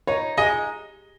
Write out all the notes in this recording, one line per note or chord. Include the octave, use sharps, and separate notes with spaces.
D#4 C#5
G#3 D#5